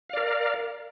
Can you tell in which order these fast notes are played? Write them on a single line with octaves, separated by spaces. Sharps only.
F5 D5 A#4